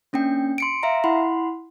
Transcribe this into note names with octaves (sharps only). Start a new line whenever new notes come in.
A#3 C#4 D4 G5
C6 C#7 D7
E5 F5 A#5
E4 F#5 B5 C6